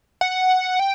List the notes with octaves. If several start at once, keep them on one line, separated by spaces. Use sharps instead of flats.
F#5
G5